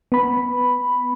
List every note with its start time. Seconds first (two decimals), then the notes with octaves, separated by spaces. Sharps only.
0.12 B3 B5